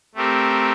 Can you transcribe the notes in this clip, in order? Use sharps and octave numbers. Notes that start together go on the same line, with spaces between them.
A3 C4 G4 A#4